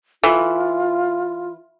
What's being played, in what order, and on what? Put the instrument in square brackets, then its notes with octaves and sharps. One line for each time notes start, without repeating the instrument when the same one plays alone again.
[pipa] E3 [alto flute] F4 [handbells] A4 E5